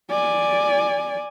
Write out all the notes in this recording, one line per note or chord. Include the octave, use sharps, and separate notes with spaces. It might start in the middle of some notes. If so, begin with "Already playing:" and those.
D5 G#5